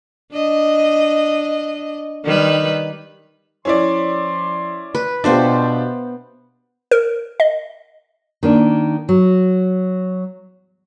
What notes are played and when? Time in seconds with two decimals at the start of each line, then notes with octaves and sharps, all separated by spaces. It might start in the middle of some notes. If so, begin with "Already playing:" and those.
0.32 D4 D#5
2.24 D#3 G3 B4
3.65 F3 C#4 E4 D5 C6
4.95 B4
5.24 B2 B3 D4 F4 G4 C5 E5
6.91 A#4
7.40 D#5
8.43 D#3 A#3 D4
9.09 F#3